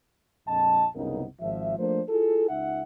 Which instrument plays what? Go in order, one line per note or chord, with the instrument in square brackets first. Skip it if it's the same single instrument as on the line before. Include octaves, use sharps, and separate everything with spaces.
[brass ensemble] A#1 F2 D#5 A5
F#1 C2 C#3 B3 D#4 A#4
G#1 F3 E5
F3 A3 A#3 D4 C5
E4 F4 G#4 A4
C#2 D#4 E5 F#5